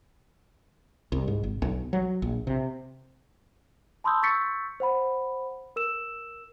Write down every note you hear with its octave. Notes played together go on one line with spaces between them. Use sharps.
C2
G#2
G#1
B1
F#3
A#1
C3
A5 B5 C6 D#6 E6 G6
C#6 E6 G6 A6 B6 C#7
C5 F#5 B5
A#4 E6 E7